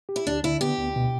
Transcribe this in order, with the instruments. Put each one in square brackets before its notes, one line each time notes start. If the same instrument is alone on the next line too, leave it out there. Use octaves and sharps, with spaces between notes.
[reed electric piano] G4
[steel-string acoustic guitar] E4
[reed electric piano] D2 [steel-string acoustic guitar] D4
[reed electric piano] D3 [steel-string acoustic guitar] E4
[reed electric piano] B3 [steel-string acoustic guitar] G4
[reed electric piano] D2
B2